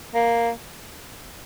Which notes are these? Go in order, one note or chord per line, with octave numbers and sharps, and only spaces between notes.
A#3